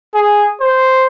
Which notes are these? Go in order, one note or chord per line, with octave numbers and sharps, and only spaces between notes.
G#4
C5